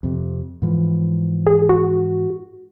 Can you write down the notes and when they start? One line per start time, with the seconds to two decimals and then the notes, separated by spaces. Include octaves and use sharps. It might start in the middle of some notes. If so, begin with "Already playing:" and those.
0.03 F2 C3
0.62 G#2 E3 F3
1.47 G#4
1.69 F#4